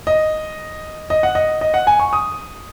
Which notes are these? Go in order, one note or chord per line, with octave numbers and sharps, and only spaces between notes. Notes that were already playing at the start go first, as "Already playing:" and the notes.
D#5
D#5
F#5
D#5
D#5
F#5
G#5
C#6
D#6